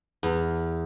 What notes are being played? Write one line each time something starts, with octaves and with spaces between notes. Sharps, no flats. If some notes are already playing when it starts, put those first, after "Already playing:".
E2